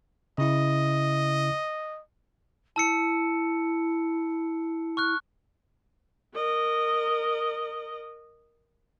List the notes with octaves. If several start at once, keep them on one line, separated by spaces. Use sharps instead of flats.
C#3 E4 D#5
E4 A5 E6 C#7
C#6 F6 F#6
A#4 D#5